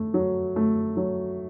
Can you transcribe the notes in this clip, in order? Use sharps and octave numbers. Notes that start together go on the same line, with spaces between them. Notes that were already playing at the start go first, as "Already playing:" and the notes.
Already playing: A3
F#3
A3
F#3